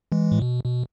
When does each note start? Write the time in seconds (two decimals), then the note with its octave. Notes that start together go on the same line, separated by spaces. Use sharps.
0.12 E3 G#3
0.32 A2
0.42 B2
0.64 B2